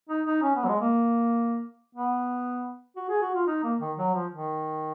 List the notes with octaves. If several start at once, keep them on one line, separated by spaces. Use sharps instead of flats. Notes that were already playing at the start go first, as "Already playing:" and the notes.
D#4
D#4
C#4
B3
F#3
G#3
A#3
B3
F#4
G#4
F#4
F4
D#4
A#3
D#3
F#3
F3
D#3